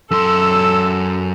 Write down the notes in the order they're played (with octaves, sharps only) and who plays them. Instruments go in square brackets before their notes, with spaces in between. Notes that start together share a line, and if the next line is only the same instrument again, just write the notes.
[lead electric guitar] F#2 C6 [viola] A4 [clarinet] E6